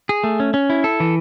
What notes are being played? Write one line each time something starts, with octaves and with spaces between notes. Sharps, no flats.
G#4
A3
C#4
C#4
E4
A4
E3